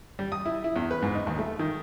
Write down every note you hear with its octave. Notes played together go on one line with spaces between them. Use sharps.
G3
D#6
E4
E4
E2
B4
G#2
D#4
D#2
A3
D#3